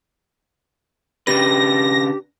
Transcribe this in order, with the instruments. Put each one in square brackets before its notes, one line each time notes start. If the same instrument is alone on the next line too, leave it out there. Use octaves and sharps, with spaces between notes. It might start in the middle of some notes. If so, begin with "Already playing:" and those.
[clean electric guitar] C#3 D4 B4 [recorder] G4 [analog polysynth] A#6